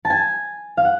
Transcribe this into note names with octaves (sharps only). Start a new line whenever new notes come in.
A5
G#5
F5
F#5